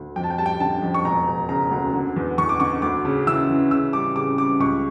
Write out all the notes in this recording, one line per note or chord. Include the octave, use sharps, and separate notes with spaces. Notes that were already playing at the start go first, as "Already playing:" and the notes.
Already playing: D2
F2 G5
A5
G5
G3 A5
G5
D3 A5
F2
C#6
E1 A#5
E1
C#3 A#5
D2
D3
E2
E2 C#6
D6
D3 C#6
D2 D6
C#3
E3 E6
E3
C#3 E6
G3 D6
C#3 D6
G3 D6
C#2 C#6